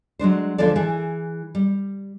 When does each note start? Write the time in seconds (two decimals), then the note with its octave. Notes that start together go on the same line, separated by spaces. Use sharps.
0.19 F#3 G#3 D4 C5
0.58 D2 D3 F3 G#3 A4 D5
0.76 E3 E4 G#4
1.55 G3